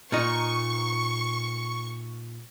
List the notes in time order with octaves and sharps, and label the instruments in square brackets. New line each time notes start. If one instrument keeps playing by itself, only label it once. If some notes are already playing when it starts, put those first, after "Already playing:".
[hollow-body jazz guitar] A#2 D#4 [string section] C#6